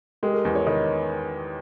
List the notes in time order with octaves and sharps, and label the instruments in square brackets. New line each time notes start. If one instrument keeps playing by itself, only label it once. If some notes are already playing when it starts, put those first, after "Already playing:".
[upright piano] G#3 [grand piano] G4 A#4
[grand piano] G4 A#4
[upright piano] E2
[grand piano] A#4 C#5
[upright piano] D#3 [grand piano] B4 D#5